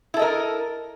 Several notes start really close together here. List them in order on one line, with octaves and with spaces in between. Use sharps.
E4 A4 D#5 A#4